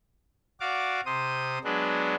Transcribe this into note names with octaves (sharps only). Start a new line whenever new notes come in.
F#4 D5 F5 D6
C3 C5 D#6
F#3 G#3 B3 D4